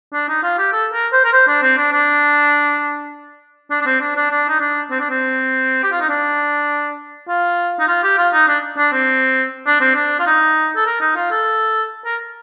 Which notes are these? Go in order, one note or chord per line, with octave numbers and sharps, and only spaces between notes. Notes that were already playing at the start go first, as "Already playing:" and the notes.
D4
D#4
F4
G4
A4
A#4
C5
A#4
C5
D4
C4
D4
D4
D4
D4
C4
D4
D4
D4
D#4
D4
C4
D4
C4
G4
F4
D#4
D4
F4
D#4
F4
G4
F4
D#4
D4
D4
C4
D4
C4
D4
F4
D#4
A4
A#4
D#4
F4
A4
A#4